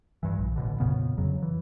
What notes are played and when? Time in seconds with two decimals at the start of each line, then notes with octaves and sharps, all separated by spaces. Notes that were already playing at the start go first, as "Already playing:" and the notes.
0.23 G2 E3
0.39 A#1
0.56 A1 B2 D3
0.80 F2 A#2 C#3 B3
1.17 F2 C#3 F#3
1.43 E3